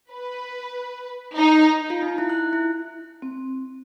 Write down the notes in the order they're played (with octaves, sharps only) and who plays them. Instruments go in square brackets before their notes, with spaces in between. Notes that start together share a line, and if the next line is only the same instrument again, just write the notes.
[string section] B4
D#4
[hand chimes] F4
D#4
E4
F#6
E4
[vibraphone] C4